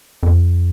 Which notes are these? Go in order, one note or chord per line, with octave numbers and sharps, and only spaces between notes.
F2